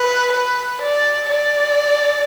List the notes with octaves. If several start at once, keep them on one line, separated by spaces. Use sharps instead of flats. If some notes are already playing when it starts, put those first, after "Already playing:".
Already playing: B4
B4
D5
D5